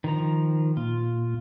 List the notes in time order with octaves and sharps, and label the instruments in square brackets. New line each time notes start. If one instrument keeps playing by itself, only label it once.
[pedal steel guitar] D#3 F3 A#5
[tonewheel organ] A#2 [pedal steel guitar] F4